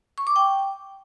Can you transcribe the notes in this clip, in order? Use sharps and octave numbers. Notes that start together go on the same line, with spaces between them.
C#6
D6
G5